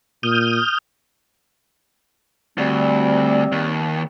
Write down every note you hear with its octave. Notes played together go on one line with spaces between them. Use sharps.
A#2 D#6 F6 G6
D2 G3 C4
D#2